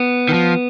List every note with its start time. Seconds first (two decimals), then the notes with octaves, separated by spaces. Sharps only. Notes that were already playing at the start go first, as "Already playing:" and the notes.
Already playing: B3
0.29 D#3
0.34 F3